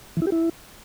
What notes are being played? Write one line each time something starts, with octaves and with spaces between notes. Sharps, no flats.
E3
E4
G4
E4